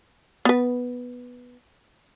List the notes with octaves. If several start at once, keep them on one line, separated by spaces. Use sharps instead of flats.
B3 B4